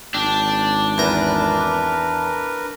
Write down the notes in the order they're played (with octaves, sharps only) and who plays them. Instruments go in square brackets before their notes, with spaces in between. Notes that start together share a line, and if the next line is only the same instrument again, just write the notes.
[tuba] G#1 [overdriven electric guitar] D4 [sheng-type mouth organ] G5
[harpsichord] E2 A#5 [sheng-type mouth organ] A#4 B4